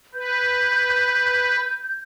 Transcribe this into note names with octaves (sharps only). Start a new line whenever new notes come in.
B4 G6